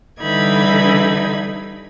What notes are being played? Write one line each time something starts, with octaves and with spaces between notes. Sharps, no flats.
D3 E3 G3 D#4 B5 G#6